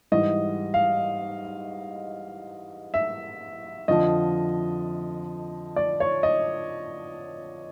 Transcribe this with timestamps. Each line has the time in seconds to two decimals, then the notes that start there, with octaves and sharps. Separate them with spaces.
0.12 G#2 E3 G3 D#5
0.74 F5
2.94 E5
3.88 F2 D3 F3 D#5
5.76 D5
6.00 C#5
6.23 D#5